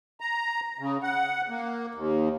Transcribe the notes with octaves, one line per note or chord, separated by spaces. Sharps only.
A#5
C#3
F#5
A#3
D#2